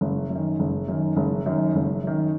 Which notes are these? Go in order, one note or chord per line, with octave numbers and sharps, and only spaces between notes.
F#1
F#2
D#3
F#1
F#2 D#3
F#1
F#2 D#3
F#1
F#2 D#3